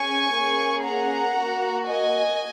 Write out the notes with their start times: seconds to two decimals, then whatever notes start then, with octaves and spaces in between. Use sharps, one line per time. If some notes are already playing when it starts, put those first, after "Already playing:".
Already playing: C#4 G#4 G#5 C#6
0.34 A#3 C#4 G#4
0.85 F#5 A#5
1.37 A#3 F#4
1.88 D#5 G#5